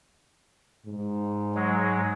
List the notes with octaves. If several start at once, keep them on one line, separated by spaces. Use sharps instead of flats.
G#2
F#3 G#3